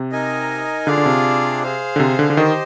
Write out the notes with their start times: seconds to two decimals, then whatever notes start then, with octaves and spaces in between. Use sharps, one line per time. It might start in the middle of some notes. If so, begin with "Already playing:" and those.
Already playing: C3
0.12 D#4 A#4 D#5 G#5
0.87 D3 D4 F4 G#4 D5 F5
0.98 D3
1.06 C3
1.63 G#4 C5 F5
1.96 D3
2.00 C3
2.19 D3
2.30 D3
2.37 D#3 G4 C5 D#5